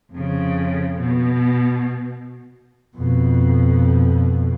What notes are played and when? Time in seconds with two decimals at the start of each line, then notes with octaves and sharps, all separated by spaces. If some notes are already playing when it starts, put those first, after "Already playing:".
0.12 F2 C#3
0.99 B2
2.96 F2 B2